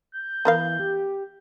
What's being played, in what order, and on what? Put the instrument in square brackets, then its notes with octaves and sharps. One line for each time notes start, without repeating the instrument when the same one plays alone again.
[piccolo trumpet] G6
[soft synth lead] E3 [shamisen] B3 A#4 F5
[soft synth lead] G4